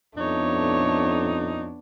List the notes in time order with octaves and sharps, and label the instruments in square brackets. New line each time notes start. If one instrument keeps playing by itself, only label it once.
[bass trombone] F2 [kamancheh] A3 C#5 [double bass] B3 D4 [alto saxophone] D#4